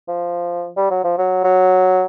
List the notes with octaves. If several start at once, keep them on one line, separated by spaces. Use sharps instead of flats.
F3
G3
F#3
F3
F#3
F#3